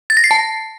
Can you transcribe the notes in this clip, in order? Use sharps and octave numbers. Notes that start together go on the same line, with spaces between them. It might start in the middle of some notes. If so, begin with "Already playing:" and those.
A6
A#6
C7
A5